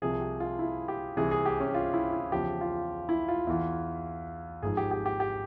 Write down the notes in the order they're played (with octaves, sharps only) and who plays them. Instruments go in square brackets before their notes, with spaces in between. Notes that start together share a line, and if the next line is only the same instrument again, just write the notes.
[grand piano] C2 C3 F3 G#4
G4
F4
E4
G4
C2 C3 E3 G#4
G#4
G4
C#4
F4
E4
E4
E2 C#3 F3 G4
F4
E4
F4
E2 E3
G#1 G#2 F3 G#4
G4
G4
G4
G4